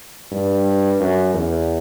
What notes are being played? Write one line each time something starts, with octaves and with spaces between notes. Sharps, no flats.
G2
F#2
E2